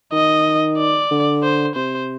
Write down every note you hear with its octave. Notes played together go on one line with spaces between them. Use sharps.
D#3 D#5
D5
D3
C5
C3 C5